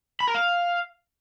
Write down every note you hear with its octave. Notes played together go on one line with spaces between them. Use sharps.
B5
A#4
F5